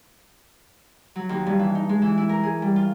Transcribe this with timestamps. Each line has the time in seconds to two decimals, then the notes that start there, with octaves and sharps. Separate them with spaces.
1.16 F#3
1.29 D#2
1.46 G2
1.59 E3
1.75 D#4
1.89 G#3
2.02 E3
2.17 E4
2.29 A#4
2.43 G#4
2.62 G3
2.76 F4